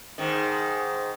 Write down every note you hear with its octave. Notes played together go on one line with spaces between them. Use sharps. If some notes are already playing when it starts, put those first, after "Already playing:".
G#2 D#3